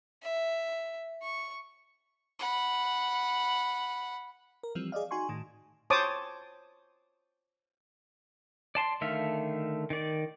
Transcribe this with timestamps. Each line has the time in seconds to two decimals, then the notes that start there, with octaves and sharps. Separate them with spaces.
0.23 E5
1.22 C#6
2.39 F#5 B5
4.63 A#4
4.75 E3 F3 G3 C4
4.92 G#4 D5 D#5 F5
5.11 D#4 F#4 G#5 C6 C#6
5.29 A2 D#3
5.90 C5 C#5 A5 D6 D#6
8.75 D5 A5 C6
9.01 D3 D#3 A3 E5 F5
9.90 D#3 D5